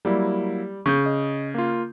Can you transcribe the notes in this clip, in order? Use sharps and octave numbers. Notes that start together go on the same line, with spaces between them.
F#3 G3 A#3 E4
C#3 C#6 D#6 G6
D#5
A#3 F4